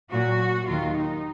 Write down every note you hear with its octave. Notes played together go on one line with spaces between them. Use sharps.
A#2 F#3 F#4
D#2 D#3 F#3 F4
D#4